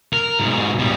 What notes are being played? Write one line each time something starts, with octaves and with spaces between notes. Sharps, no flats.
A#4
G#2 B2
B2 G3